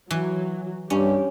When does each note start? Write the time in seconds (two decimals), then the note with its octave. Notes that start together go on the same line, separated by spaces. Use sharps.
0.10 E3 F#3
0.90 G2 C#4 G4